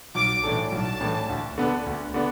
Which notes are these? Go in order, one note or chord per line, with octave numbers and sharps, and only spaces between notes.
B1 D6
A2 E3 D4 A4
B1 A5
A2 E3 D4 A4
D2
D3 B3 D4 A4
D2
D3 B3 D4